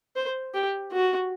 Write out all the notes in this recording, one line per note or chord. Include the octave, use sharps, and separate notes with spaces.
C5
G4
F#4